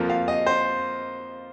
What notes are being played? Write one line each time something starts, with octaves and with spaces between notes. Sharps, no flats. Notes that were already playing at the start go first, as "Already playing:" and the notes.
Already playing: F2 F3 A#3
F5
D#5
C5